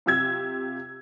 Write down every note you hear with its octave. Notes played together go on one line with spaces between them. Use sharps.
C3 F4 G4 E6 G#6